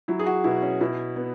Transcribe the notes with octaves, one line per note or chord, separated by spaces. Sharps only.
F#3 E4
G#4
F#4
B2 E4
C#4
B2 E4
B3